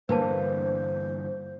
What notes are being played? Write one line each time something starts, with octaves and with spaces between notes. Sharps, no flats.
G2 D3 E3 A#3 B4 C5 A5